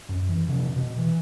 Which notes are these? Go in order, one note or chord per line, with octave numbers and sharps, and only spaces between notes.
F#2
E3
C3 F3 C#4
B2
E3